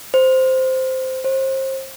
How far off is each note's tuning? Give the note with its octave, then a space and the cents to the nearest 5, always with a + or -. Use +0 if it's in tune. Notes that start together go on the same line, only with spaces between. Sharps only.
C5 -5
C5 +30